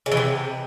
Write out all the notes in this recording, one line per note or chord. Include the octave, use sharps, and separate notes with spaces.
C#3
E3
C3